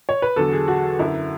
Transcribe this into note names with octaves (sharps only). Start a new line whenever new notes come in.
C#5
B4
E2 D3 F#3 A4
G#4
F#4
F#2 D3 F#3 E4